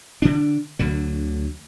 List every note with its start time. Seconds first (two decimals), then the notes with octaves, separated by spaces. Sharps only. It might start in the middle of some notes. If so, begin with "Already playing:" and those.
0.22 D3 D4
0.79 D2 D3 F#3